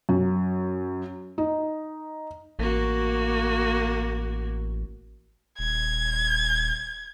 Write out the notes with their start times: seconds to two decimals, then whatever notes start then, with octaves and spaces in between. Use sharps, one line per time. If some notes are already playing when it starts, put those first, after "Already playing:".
0.09 F#2
1.38 D#4
2.59 A1 A#3 F#4
5.59 D#1 G#6